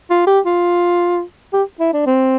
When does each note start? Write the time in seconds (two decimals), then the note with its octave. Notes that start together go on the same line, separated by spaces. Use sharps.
0.10 F4
0.27 G4
0.46 F4
1.53 G4
1.80 E4
1.94 D4
2.06 C4